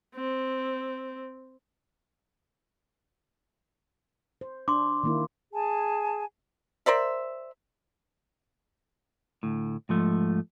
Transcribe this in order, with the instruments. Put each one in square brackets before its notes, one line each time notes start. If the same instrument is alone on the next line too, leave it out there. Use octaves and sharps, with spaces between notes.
[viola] C4
[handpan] C5
[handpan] D4 [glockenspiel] C6 D6
[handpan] D#3 A#3 E4
[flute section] G#4 G#5 A5
[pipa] A#4 C5 D5 E5
[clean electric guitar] D2 A2
G#2 F3 A3